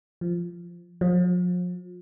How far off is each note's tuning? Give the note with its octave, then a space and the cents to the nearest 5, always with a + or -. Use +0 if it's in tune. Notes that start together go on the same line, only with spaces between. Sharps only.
F3 -10
F3 +40